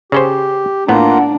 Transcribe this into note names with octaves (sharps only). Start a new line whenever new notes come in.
C#3 C#4 G4 C5
A2 A#3 B3 D4 F4 F#5 A#5